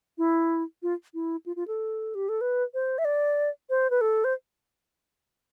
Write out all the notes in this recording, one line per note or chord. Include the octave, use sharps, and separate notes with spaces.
E4
F4
E4
F4
F4
A4
G4
A4
B4
C5
E5
D5
C5
B4
A4
C5